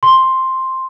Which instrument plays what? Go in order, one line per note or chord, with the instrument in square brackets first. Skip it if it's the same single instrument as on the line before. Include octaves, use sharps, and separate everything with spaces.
[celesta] C6